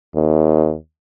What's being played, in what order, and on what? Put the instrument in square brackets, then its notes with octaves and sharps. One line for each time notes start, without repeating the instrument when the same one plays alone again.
[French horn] D#2